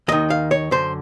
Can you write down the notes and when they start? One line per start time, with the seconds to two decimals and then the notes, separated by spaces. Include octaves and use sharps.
0.08 D#2 D#3 D#5
0.30 F5
0.51 C#5
0.71 F#2 D3 C5